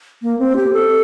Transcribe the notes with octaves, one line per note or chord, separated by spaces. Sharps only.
A#3
C4
G4
A4